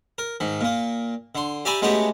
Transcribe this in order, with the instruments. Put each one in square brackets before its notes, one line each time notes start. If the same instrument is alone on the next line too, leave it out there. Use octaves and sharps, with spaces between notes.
[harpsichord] A#4
G#2 D#3
A#2 A#3
D3 C6
G4 D5 E5 G#5 A#5 B5
G#3 A3 B3 C#4 F#4 G4